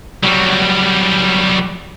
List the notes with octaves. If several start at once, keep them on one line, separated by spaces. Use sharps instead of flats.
F#3 G3